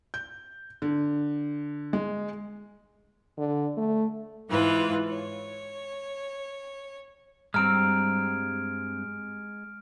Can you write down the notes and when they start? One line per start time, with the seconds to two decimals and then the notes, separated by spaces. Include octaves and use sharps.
0.14 G6
0.82 D3
1.93 G#3
3.38 D3
3.77 A3
4.49 G#2 E3 F4 B4
5.08 C#5
7.54 G2 G3 G#3 C4 A#5 E6 F6 D7